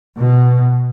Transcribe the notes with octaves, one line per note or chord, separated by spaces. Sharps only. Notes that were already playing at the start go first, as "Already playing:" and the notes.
B2